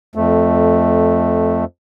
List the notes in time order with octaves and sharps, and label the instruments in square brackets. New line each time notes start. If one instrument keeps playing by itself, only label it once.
[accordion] F2 A3